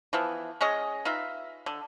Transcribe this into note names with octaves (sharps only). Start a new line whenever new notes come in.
E3 F3 B3
G#3 C#4 G#4 D#5
D#4 F4 B4 E5
D3